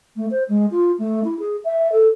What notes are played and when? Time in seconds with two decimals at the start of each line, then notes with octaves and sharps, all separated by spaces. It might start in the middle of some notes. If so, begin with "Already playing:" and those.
0.16 A3
0.30 C5
0.49 G#3
0.70 F4
0.98 A3
1.24 E4
1.39 G#4
1.64 E5
1.92 A4